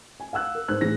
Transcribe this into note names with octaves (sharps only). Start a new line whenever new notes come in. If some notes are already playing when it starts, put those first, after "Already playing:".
G#5
F5 F#5 E6 F#6
A#4
G#2 C5 F#6
A2 E3 G#4 A#6